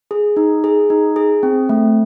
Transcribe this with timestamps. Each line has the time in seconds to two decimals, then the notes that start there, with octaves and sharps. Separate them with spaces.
0.11 G#4
0.37 D#4
0.64 G#4
0.90 D#4
1.16 G#4
1.43 C4
1.69 A3